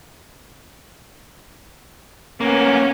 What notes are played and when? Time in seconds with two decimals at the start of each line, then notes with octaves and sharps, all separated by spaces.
2.41 A#3 B3 C#4